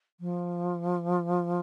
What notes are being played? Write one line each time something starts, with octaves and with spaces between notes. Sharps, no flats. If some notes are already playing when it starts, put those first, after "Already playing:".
F3